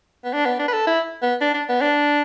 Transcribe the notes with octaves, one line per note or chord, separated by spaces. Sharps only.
B3
D4
B3
D4
B4
A4
E4
B3
D4
D4
B3
D4